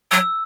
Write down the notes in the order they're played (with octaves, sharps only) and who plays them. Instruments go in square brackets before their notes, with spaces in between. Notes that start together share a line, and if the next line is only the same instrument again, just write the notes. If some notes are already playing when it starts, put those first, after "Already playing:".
[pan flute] F#3 [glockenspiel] E6